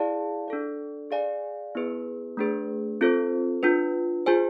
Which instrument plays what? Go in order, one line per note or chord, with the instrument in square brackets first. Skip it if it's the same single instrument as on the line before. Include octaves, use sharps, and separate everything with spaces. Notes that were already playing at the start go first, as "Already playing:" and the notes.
Already playing: [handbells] E4 G#4 D5 F5 A5
D4 A4 D5
G#4 D5 F5 G#5
B3 E4 G#4 B4
A3 D4 G#4 B4
C4 F4 A4 C5
D4 F4 B4
F4 G#4 C5 G#5